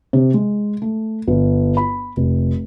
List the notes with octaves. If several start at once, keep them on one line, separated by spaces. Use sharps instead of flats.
C3
G#3
A3
G1
B5
F1